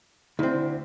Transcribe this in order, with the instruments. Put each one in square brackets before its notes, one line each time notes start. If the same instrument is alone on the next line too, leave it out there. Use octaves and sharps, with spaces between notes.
[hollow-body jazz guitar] D2 C4 [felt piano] E4